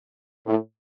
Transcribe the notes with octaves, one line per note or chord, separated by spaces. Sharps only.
A2